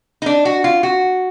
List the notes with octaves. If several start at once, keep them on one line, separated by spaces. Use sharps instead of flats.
D#4
D4
F#4
F4
F#4